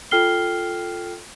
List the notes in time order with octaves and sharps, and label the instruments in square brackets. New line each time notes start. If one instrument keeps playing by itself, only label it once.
[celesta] F4 A4 G5 F6 C7 G7